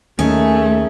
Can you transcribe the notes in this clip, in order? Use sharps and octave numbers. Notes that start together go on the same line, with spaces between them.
D#2 A3 C#4 G#4 A#4 E5